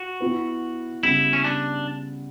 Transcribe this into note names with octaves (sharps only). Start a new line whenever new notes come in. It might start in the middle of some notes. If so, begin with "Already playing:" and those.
Already playing: F#4
B3 E4 B4
C#3 G3 B3 E4
C#4
D4